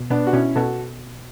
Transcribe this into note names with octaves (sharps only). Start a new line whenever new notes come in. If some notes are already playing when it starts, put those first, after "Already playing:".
Already playing: B2
B2 B3 D4
F#4
B2 C#4 E4
B2 F#4 A4